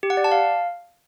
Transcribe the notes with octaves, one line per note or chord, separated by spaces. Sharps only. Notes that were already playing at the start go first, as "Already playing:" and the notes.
G4
F#5
D5
A5
F5